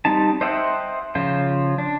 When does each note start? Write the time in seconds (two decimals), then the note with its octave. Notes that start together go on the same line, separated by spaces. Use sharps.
0.05 G3 C4 D#4 A5
0.41 C5 D#5 E5 F#5 G5
1.15 C#3 F3 F4 C5
1.78 D4